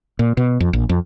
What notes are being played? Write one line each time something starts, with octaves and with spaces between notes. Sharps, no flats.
A#2
B2
F2
A#1
F2